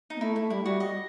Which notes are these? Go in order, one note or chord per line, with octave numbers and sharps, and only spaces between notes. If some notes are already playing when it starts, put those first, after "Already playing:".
D#4
B3
A3 E4
A3 E4
G3 E4
G3 F#4
D#5